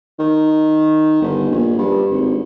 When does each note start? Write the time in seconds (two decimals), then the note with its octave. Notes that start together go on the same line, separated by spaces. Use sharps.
0.19 D#3
1.22 G1
1.50 A#1
1.78 G2
2.11 G#1